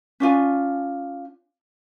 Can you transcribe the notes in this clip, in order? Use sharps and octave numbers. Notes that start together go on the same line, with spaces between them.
C#4 D4 F4 G#5